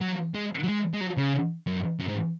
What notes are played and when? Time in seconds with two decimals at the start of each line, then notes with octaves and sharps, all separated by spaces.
0.01 F#3
0.34 G#3
0.63 F#3
0.68 G#3
0.93 G#3
1.01 F#3
1.17 C#3
1.67 F#2
1.99 F#2
2.08 G#2